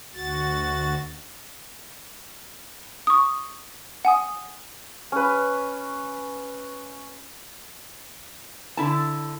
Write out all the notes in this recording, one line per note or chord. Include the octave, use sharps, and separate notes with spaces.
D2 F#4 A6
C#6 D#6
F#5 G#5 D#6
C#4 B4
D3 E4 A5